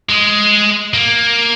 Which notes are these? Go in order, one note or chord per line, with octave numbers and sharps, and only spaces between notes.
G#3
A#3